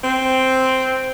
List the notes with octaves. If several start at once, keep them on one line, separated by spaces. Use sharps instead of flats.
C4